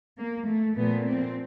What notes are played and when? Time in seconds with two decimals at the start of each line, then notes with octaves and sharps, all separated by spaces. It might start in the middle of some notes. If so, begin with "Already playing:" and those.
0.18 A#3
0.47 A3
0.76 A#2 F3 A3 B3
1.06 C4